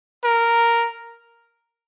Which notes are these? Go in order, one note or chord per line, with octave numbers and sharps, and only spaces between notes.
A#4